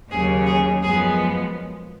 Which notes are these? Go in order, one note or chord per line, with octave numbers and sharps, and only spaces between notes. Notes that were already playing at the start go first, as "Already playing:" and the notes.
D#2 C#3 F#3 C#4 G#4
G#4
F#2 F3 G#3 B3 G#4